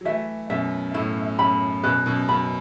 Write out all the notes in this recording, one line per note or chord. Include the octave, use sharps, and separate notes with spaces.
F#3
E3 A3 E5
F#2 B2 E5
A2 E4
F#2 B5
F#2 B2 B4
F#2 B2
F#2 B5